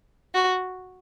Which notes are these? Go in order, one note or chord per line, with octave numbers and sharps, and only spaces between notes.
F#4